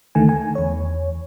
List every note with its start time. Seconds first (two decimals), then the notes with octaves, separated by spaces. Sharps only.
0.15 D2 D3 D#3 A3 G#5
0.29 G#5
0.55 E2 C#5